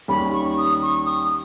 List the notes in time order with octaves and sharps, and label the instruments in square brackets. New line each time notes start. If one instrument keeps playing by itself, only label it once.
[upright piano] D#2 D#3 G3 C#4 G4 [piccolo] B5
[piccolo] C#6
D#6
C#6
D#6